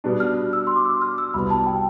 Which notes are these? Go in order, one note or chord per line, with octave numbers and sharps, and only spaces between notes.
B2 G3 B3 D4
F6
E6
C6
D6
E6
F6
E6
C2 B2 G3 B3 B5
A5
G5